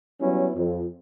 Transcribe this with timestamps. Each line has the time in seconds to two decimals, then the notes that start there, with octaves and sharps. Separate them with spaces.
0.21 F#3 G3 B3 C#4 E4
0.56 F2